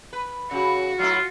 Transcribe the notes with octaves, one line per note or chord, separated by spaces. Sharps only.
B4
C#3 F#4
F#3 A3 E4 F4